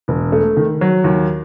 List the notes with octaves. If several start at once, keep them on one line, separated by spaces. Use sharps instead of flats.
E1
A3
D#3
F#3
D#2